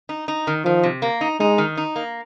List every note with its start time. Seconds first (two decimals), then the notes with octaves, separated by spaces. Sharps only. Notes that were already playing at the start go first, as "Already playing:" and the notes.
0.09 D#4
0.28 D#4
0.47 D#3
0.65 D#3 F3
0.84 C3
1.02 A#3
1.21 D#4
1.40 G#3 D#4
1.58 D#3
1.77 D#4
1.96 A#3